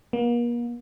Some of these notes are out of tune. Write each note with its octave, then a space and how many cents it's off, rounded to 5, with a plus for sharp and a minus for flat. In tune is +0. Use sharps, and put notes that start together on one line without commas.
A#3 +40